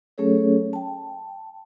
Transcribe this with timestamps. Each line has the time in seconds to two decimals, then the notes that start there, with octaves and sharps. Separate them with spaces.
0.18 F#3 A3 C#4 G#4 A4 C#5
0.73 G5 A5